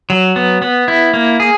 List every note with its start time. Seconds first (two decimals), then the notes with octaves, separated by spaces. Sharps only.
0.10 F#3
0.36 B3
0.62 B3
0.88 E4
1.14 A#3
1.40 G#4